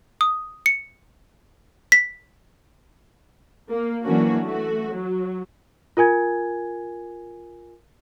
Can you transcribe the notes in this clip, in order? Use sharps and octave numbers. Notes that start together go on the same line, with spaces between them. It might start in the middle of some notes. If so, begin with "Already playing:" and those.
D#6
C#7
B6
A#3
E3 F#3 A#3 C#4 D4 F#4
A3 F#4
F#3
F4 A#4 G#5 G#6